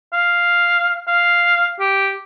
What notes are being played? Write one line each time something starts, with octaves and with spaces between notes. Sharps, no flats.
F5
F5
G4